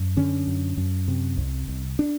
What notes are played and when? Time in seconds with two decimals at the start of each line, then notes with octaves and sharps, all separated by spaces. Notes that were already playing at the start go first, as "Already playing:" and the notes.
Already playing: F#2
0.17 D3 C#4
0.47 F#2
0.77 F#2
1.08 C3
1.37 C2
1.68 C2
1.99 D4